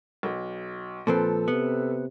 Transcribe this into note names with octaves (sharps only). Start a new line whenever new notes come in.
B1
A#2 F3 C4 A4 B4
C3 B3